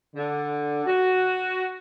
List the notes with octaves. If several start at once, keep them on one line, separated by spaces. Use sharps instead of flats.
D3
F#4